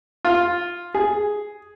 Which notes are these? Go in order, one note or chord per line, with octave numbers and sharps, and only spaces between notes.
F4
G#4